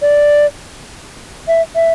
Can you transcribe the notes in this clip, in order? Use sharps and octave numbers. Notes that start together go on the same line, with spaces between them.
D5
E5
E5